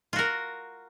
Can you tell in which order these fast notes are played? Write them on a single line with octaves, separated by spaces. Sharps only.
F4 F#4 A#4